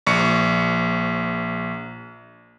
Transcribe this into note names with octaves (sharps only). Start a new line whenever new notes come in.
A#1 C#6 C#7